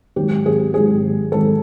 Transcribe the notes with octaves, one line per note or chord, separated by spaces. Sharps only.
G#2 D#3 F#3 G4
G#4
G#2 D#3 F#3 G#4
G#2 D#3 F#3 A4